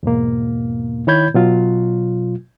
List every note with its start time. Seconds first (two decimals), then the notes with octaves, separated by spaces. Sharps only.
0.03 E2 G#2 B2 A#3
1.07 D#3 E4 C#5 B5 G6 G#6
1.34 B2 F#3 F4